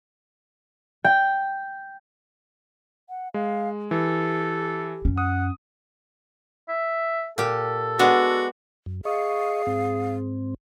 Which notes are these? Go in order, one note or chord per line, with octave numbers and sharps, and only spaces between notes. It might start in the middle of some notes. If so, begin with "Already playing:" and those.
G5
F#5
G#3 F5
E3 G4 A4
F#2 C#4
F#5 D#6
E5
A#2 G4 A4
G#3 B3 D4 F#4
F#2
G#4 D#5 F5 C#6
G#2 C4